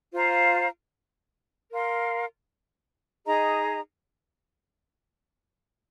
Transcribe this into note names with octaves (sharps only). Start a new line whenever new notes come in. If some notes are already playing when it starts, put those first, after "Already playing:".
F4 C5 F5 A#5
A#4 F5 C6
D#4 G#4 D#5 A#5